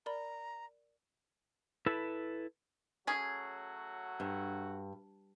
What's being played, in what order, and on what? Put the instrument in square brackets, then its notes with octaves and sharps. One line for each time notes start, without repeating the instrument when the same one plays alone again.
[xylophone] A#4 D5 B5 [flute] A#5
[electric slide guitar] E4 A4 B4
[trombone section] F#3 A3 F#4 [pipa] C#4 G#4
[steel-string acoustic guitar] G2